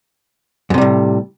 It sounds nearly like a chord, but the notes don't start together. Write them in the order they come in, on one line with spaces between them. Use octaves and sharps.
F#2 C3 G3 A2